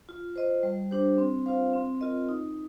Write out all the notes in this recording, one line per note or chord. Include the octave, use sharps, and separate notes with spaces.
F4
C5 D#5
G3
D4 G4 C5
C4
F4 C5 F5
C4
F4 A#4 D#5
D#4